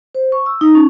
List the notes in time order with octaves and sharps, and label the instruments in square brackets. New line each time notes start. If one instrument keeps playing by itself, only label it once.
[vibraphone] C5
C#6
E6
D#4
C#4